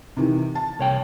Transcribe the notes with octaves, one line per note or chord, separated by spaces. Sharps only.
C3 D#3 E3
A5
C2 C#5 G5